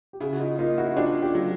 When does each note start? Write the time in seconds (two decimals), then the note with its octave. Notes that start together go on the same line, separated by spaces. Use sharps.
0.13 G4
0.20 C#3 E4 F#4
0.33 F#4
0.40 D#4 F4
0.59 A#3 D#4 F4
0.78 E4 F#4
0.97 D4 F4 G4
1.22 F4 G4
1.35 F#3